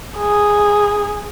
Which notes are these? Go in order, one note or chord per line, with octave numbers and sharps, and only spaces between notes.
G#4